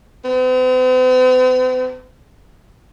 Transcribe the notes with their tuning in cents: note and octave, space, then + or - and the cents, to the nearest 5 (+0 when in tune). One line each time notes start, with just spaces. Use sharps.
C4 -45